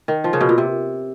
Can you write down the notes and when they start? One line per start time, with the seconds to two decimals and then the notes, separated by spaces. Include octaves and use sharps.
0.08 D#3
0.24 F3
0.33 C#3
0.41 B2
0.49 A#2
0.58 C3